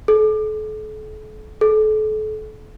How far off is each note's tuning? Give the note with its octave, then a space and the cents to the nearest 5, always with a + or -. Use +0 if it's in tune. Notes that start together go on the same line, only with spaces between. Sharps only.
A4 -40
A4 -35